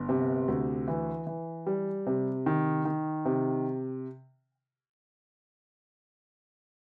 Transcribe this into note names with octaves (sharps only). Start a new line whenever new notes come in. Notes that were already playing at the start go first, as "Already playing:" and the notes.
Already playing: G1
C3
D2
E3
E3
G3
C3
D#3
D#3
C3